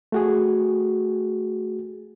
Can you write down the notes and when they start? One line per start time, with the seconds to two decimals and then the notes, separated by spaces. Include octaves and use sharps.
0.12 A3 F#4 G#4